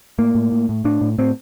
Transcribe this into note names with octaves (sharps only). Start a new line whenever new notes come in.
A2 A#3
A2
A2
A2
A2 D4
A2
A2 C4